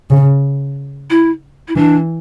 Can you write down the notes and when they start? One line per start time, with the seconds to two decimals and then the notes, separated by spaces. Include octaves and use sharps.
0.10 C#3
1.10 E4
1.68 E4
1.76 E3 D4